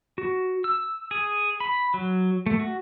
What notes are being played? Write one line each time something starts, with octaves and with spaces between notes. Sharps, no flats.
F#4
E6
G#4
B5
F#3
A3
F#4